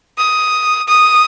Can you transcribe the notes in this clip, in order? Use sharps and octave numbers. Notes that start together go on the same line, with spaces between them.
D#6
D#6